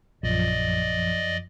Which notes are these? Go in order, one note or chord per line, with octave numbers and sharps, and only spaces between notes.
A#1 F#2 F3 D5 D#5